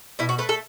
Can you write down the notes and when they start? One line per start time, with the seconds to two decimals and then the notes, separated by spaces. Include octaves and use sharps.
0.19 B2 E4
0.29 F#4
0.38 A3 B4
0.49 A4